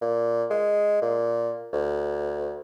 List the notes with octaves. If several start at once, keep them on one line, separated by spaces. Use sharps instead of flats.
A#2
G#3
A#2
D2